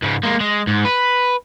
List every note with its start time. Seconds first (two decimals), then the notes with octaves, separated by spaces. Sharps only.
0.02 G#2 C#3
0.23 G#3 A#3
0.40 G#3
0.67 G#2
0.85 B4